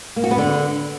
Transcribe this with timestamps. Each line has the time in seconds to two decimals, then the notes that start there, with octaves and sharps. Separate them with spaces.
0.16 A#3
0.24 F#4
0.31 B3
0.38 D3